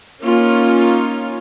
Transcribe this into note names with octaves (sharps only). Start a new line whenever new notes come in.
A#3 C#4 D#4 F4